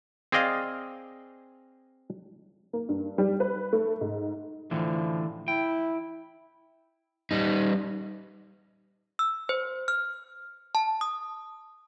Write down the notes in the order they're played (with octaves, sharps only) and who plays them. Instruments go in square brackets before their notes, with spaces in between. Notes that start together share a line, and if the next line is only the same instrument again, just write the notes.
[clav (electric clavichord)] C4 G#4 D5 D#5 F5
[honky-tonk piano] A#3
G2
G3
B4
A3
G#2
[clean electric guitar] A2 D3 E3 [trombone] F3
[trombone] E4 [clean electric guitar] G5
[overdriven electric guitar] G3 D#4
[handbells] E6
C5
F6
A5
D#6